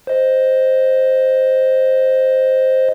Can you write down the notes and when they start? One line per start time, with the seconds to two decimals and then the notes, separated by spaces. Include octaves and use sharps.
0.07 C5 D#5